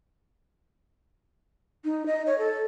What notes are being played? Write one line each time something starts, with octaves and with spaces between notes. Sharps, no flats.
D#4
D#5
C#5
A4